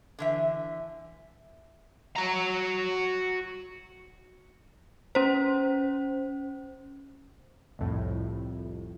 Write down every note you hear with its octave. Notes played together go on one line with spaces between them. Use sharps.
D3 E3 E5
F#4 A#5
C#4 C5
C2 F2 A2